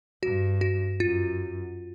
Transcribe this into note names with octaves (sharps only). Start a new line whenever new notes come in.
G2 F#4
F#4
F#2 F4